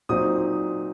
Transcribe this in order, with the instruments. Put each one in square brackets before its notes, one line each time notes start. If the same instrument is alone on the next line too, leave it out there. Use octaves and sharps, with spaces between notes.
[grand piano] A#2 F#3 C4 D#4 D#6